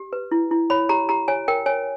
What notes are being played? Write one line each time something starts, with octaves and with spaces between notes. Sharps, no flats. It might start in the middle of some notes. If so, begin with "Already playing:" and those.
Already playing: G4
B4
E4
E4
C#5 B5
G4 A#5
G4 A#5
C#5 G#5
A#4 G5
C#5 G#5